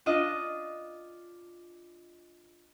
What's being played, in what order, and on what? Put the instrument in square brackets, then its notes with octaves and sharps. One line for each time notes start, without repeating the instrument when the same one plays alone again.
[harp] D4 F4 D#5